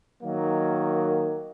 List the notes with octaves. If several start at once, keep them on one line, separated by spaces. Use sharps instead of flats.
D#3 F#3 A#3